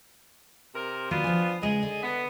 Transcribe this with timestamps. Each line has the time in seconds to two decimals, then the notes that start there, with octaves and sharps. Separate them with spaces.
0.75 C3 A#4
1.11 D#3 F#3 A#3 B3 D4 F4
1.24 F3 G#5
1.62 C#3 G#3 G#4 B4 D#5
1.83 D3
2.02 B3